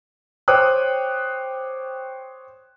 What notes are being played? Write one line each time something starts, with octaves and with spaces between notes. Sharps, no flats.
C5 C#5 G5 D6 D#6 F#6